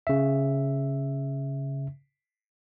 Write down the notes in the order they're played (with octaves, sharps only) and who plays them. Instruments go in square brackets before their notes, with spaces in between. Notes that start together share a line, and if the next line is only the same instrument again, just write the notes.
[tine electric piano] C#3 E5